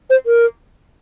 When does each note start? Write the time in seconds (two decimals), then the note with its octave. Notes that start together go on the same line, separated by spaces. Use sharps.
0.10 C5
0.26 A#4